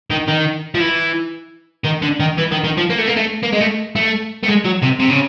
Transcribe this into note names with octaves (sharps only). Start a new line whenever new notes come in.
D#3
D#3
F3
E3
D#3
D3
D#3
E3
D#3
D#3
F3
A#3
A3
A#3
A3
A#3
G#3
A3
A3
A3
G#3
F#3
C3
C3
C#3